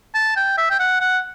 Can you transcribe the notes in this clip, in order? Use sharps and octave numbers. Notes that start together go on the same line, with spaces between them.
A5
G5
E5
G5
F#5
F#5